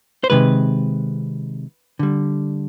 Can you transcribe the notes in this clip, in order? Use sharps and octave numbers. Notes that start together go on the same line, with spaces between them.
C5
C3 D#3 G#3 B4
D3 G3